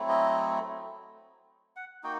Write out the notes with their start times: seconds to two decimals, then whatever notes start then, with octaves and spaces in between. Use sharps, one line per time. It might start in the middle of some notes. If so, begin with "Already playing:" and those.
Already playing: F#3 A3 C4 E4
0.09 D#5
1.76 F#5
2.03 A#3 D#4 F#4 G5